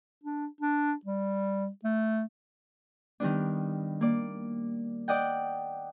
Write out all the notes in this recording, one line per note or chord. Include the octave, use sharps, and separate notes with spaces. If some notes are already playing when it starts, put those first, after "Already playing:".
D4
D4
G3
A3
D#3 G3 B3 D4
A#3 D5
D5 D#5 F#5 G5